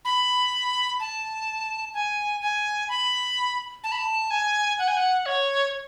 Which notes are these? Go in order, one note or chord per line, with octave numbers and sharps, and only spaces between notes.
B5
A5
G#5
G#5
B5
A5
B5
A5
G#5
F#5
G#5
F#5
C#5